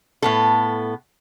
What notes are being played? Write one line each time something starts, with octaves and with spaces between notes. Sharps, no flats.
A2 B3 A4